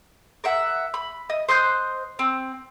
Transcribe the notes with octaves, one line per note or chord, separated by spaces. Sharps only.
A#4 E5 F#5
B5
D#5
C5 D#5 F#6 G6
C4